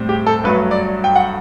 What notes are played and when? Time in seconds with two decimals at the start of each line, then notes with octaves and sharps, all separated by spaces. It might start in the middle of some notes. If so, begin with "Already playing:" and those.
Already playing: A2 G3 C4
0.09 G4
0.27 A4
0.44 G2 F#3 A3 B4
0.71 D5
1.04 G5
1.16 F#5